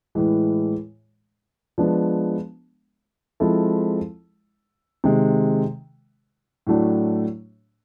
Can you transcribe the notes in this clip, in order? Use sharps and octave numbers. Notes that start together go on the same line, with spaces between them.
A2 E3 G#3
F3 G#3 B3 D4
F3 G#3 C4 E4 A4
C3 D#3 G#3
A2 F#3 A3 D4